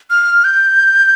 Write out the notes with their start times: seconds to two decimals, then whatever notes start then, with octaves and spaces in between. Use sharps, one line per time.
0.10 F6
0.44 G6